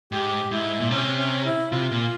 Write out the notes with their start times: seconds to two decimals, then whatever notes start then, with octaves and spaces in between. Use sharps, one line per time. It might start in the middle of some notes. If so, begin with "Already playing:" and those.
0.12 G#2 G4
0.51 G#2 E4
0.80 A#2
0.91 C3 C#4
1.18 C#4
1.45 E4
1.71 C3 F4
1.92 A#2